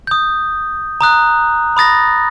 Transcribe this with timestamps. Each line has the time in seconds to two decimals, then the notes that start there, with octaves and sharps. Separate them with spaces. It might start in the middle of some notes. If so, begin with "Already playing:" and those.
0.07 D#6 G6
1.01 A#5 D#6 F#6
1.77 B5 D#6 A6 A#6